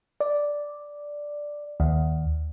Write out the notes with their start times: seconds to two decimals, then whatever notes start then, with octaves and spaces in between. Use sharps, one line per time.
0.20 D5
1.80 D#2